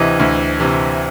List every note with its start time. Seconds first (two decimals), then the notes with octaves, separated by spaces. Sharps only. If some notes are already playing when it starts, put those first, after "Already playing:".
Already playing: D2 C3 E3 D#5
0.19 D2
0.60 C3 E3